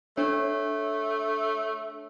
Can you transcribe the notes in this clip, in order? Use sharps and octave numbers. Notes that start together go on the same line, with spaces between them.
A3 D4 C#5